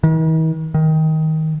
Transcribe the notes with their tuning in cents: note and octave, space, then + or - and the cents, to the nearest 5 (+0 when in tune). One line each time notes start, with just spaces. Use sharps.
D#3 +45
D#3 +20